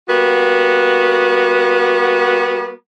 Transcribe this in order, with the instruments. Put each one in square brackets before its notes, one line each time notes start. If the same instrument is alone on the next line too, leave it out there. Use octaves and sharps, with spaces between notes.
[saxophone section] G3 A#3 B3 F#4